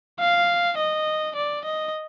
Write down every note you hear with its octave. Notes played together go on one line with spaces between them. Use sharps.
F5
D#5
D5
D#5